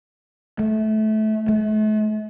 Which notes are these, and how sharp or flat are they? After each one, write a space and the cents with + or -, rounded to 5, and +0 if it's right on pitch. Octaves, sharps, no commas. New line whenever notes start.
A3 -20
A3 -40